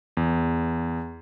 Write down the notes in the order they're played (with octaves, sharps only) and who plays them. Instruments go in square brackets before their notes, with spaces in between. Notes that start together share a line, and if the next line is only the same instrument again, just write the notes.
[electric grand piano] E2